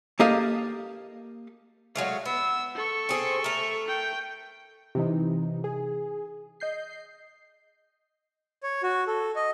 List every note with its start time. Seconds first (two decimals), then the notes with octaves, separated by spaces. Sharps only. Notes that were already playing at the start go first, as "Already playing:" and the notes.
0.20 A#3 G4 A4 D#5 F5
1.95 F#3 G#3 A3 F5
2.26 B3 E6
2.75 A4 C#6
3.09 C4 G#4
3.44 A3 A#4
3.87 G5
4.95 C3 E3 D#4
5.64 G#4
6.60 D#5 G6 C7
8.63 C#5
8.83 F#4
9.07 A4
9.36 D#5